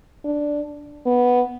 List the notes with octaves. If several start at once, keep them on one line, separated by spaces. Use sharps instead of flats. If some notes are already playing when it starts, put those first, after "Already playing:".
D4
B3